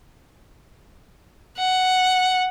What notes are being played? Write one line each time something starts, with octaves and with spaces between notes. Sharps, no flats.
F#5